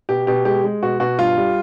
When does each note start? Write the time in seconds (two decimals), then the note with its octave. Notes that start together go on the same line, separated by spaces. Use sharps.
0.09 B2 G4
0.27 B2 G4
0.45 G#3 G4
0.64 G#3
0.83 B2 F#4
1.00 B2 F#4
1.18 G2 F4
1.37 G3